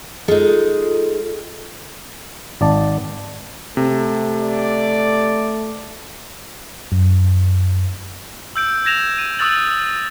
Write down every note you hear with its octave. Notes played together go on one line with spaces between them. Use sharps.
G#3 D#4 F4 A4
G#1 D5 A5
C3 A3
D5
F#2
E6 G6 D7
G6 G#6 A#6 E7 F7
D#7
C#6 D#6 E6 F#6 A6 F#7